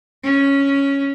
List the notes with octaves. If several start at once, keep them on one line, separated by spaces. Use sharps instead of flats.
C#4